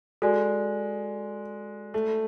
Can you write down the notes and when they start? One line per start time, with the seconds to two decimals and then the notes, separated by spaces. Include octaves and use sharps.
0.22 G#3 F#4 A4 D5 G#5
1.94 A3